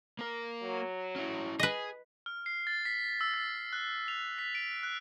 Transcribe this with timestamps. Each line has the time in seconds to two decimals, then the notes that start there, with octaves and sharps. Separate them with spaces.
0.19 A#3 A#4
0.63 F#3
1.16 C#4 E4
1.60 G#4 B4 D#5
2.26 F6
2.46 C7
2.67 A6
2.85 B6
3.21 E6
3.34 A6
3.73 F#6
4.08 F7
4.38 B6
4.55 D7
4.83 F#6